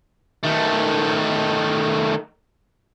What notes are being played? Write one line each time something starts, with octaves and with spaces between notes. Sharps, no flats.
D#3 A3